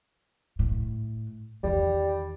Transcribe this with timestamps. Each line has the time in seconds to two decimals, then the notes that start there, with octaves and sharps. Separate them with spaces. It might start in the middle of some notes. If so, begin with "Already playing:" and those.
0.59 A2
1.63 E2 D#3 G3